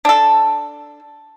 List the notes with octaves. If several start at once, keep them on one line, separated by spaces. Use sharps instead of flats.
D4 A4